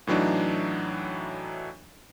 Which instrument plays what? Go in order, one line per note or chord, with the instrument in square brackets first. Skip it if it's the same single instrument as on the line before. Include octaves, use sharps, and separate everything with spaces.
[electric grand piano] A2 E3 F#3 D4 D#4